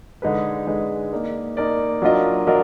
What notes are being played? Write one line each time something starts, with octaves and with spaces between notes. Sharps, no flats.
D3 G#3 D#4 G#4 B4
D3 G#3 D#4 G#4 B4
A#3 D#4 A#4 D5
A#3 D#4 A#4 D5
F#3 D4 F4 A#4 D#5
F#3 D4 F4 A#4 D#5